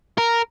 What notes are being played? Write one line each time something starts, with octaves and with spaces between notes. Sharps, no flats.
A#4